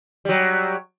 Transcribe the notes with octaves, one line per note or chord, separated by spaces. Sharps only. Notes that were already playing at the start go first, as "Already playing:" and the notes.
F#3 G3